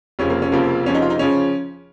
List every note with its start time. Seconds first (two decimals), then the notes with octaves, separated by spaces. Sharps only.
0.19 F1 F2 C#3 F3 C#4
0.30 A#3
0.42 C#4
0.52 F1 F2 C#3 F3 A#3
0.86 F1 F2 C#3 F3 C#4
0.95 D#4
1.02 F4
1.10 D#4
1.19 C#3 F3 C#4